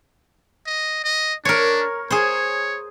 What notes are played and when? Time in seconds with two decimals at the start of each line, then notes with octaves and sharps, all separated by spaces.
0.67 D#5
1.04 D#5
1.45 D4 A#4 C#5
2.11 G#4 C5 C#5